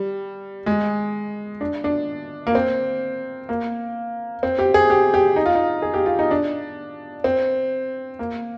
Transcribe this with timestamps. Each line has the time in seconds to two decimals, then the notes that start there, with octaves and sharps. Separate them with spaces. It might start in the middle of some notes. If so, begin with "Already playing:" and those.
Already playing: G3
0.66 G#3
1.61 D4
1.84 D4
2.47 A#3
2.55 C4
3.49 A#3
4.43 C4
4.59 G4
4.74 G#4
4.90 G4
5.14 G4
5.36 D#4
5.46 F4
5.55 D#4
5.82 G#4
5.94 G4
6.06 F4
6.19 D#4
6.31 D4
7.24 C4
8.19 A#3